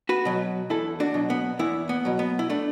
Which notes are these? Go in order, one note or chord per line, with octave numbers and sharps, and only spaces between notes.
F#4 B4
B2 F#3
E2 E4 A4
D4 F#4
B2 F#3
B3
E2 B3 E4
B3
B2 F#3
B3
E4
A3 D4